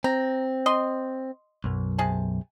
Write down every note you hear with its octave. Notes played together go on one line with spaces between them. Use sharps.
C4 A#5
D#5 C6
B1 F#2
C3 G#4 A5